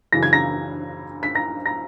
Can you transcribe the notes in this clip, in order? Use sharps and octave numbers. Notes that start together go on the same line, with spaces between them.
F#2 C#3 E3 A#6
G#6
A#5 A#6
B6
A#5 A#6
A#5 A#6